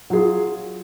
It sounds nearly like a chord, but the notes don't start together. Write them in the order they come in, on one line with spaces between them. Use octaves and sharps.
F#3 G#4 F4